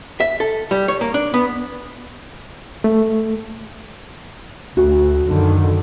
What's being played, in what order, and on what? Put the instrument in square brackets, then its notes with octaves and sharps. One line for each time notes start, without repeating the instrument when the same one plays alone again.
[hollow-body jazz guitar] E5
A4
G3
C#5
A#3
D4
B3
[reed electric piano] A3
[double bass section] D2 [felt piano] F#4
[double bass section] F#2 D3 D#3